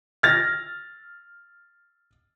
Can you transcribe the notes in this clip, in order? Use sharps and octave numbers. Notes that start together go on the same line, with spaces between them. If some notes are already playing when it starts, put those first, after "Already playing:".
F6 A6 A#6